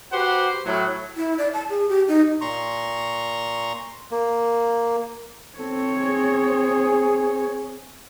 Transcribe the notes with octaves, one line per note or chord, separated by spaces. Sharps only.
F#4 G4 B4 C5 F#5
A2 F#3
E4
D5
A5
G#4
G4
D#4
A#2 A#5 C6 C#6
A#3
C4 A4 C#5
G#4